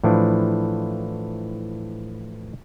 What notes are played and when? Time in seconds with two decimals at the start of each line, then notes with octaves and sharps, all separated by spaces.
0.04 A2 E3 F3 D4